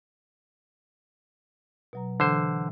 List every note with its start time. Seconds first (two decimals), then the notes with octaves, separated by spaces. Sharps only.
1.93 B2 F#3 A#5
2.20 D3 E3 C5